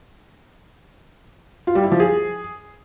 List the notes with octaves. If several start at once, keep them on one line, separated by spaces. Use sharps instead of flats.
F4
G3
E4
F3
G#4